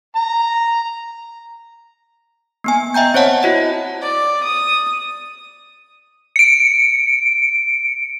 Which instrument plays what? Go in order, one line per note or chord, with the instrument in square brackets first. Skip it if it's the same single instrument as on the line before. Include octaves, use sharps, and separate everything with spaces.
[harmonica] A#5
[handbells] A#3 B3 G#5
D#5 E5 G5 A#5 G6
C4 C5 C#5 F#5 A5
E4 F#4 D#5
[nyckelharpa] D5
D#6
[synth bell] C#7 D7